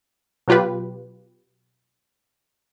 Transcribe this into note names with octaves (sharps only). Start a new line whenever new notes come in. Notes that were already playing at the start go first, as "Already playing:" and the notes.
B2 F#3 F4 G4 B4